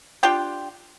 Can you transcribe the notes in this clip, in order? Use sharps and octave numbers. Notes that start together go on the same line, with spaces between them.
D4 F4 G4 G5